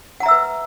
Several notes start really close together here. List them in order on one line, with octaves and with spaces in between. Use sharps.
F#5 A#5 E5 E6 B4